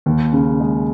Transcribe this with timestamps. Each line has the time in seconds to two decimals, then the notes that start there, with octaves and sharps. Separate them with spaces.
0.06 D#2
0.33 C#3
0.60 G#3